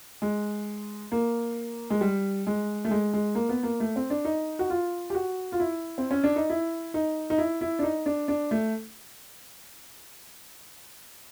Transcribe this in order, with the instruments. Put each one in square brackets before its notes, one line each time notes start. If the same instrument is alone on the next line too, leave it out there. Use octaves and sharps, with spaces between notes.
[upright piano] G#3
A#3
G#3
G3
G#3
A3
G#3
G#3
A#3
B3
A#3
A3
C4
D4
D#4
F#4
F4
G4
F#4
F4
E4
C4
C#4
D4
D#4
E4
D#4
D#4
E4
E4
D4
D#4
D4
D4
A3